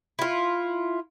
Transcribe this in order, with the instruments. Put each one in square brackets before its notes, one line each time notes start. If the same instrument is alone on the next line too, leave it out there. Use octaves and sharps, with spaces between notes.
[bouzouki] E4 F4